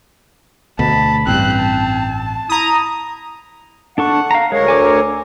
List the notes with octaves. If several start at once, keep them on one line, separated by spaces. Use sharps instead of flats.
D2 B2 A5 B5
A1 G2 C4 F#6
A5
E4 A#5 D#6
D4 A4 F#5 C#6
F5 A#5
D2 G#3 A#4 C#5
G#5 D6 E6